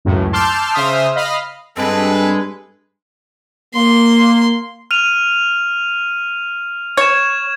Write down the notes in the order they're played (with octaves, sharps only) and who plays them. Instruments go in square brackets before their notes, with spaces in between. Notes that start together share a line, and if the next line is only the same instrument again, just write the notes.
[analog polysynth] C#2 F#2 A2
A5 C6 D6 E6 F6 G6
C#3 C5 E5 D#6 F6
D#5 F5 B5 F6
[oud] G2 [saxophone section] G#3 [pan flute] C4 [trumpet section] A4 B4
[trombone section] A#3 [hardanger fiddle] C6
[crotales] F6 D#7 F7
[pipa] C#5 [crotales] G#6 E7